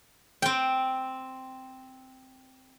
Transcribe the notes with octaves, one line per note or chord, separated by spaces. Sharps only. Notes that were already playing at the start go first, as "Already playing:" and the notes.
C4 G5